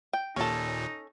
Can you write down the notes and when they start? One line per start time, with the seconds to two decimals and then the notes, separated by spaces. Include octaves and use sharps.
0.13 G5
0.36 D#2 A#2 C#4 D#4 A4